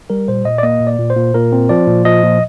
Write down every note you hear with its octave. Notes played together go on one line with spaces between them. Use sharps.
G3 A#4
A#2 C5
A#2 D#5
D5
A#3 D#5
A#2
D5
A#2
C5
A#2
A#2 A#4
C4
F3 D5
A#2
F3 D#5
A#2